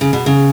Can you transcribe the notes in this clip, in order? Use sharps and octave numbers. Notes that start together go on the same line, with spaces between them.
C#3
B2
C#3